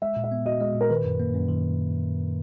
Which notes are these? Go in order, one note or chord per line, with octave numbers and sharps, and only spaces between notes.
G#3 E5
A#2
E5
B3
F#4 D#5
G#3 D#5
A#2
A#4
D#3 B4
F#2
A#3
F#2
D#3